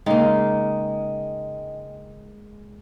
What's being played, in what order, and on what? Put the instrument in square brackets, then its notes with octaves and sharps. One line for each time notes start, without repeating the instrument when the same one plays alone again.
[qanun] C#3 D#4 F5 [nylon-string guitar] G#3 A#3 [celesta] D#5 G5